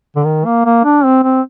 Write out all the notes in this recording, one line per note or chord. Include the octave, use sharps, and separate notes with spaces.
D3
D#3
A#3
A#3
D4
C4
C4